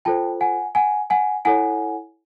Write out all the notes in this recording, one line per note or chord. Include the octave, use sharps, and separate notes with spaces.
F4 A4 C5 G5 A5
F#5 G#5
F#5 G#5
F#5 G#5
E4 A4 C#5 F#5 G#5